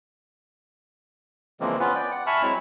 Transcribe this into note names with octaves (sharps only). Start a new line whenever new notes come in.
C#3 E3 F3 G#3 A#3 C4
B3 C#4 F4 B4
D5 G5
F#5
E5 G#5 A5 B5 C#6 F6
F#3 G#3 C4 E4